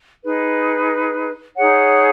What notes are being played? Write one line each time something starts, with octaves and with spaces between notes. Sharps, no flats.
D#4 G#4 B4
D#4 G#4 C#5 F#5